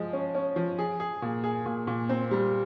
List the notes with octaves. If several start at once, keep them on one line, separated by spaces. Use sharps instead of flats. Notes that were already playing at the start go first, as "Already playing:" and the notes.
Already playing: F3 G#3
C#4
C#4
F3
G#4
G#4
A#2
G#4
A#2
A#2
C4
G3